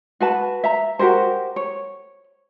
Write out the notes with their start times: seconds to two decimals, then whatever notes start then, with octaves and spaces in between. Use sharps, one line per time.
0.20 F#4 B4 A5
0.64 E5 A#5
0.99 F#4 G4 A#4 C5
1.56 C#5